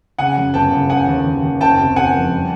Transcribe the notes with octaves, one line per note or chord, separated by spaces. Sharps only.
C#3 F#5 G#5
F#2
G1 G5 A5
C#3
C#3 F#5 G#5
D#2
D#2
D#2
F#1 G5 A5
C3
C3 F#5 G#5
F2
G3